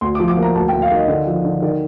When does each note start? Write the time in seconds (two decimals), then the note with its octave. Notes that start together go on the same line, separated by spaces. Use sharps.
0.01 D2 C6
0.15 D6
0.20 F3
0.28 D6
0.37 A#3
0.42 A#5
0.55 D2 A5
0.68 G5
0.73 D2
0.82 F5
0.91 D#3 D#5
1.08 D3
1.26 F3
1.44 D3
1.62 D#3 D5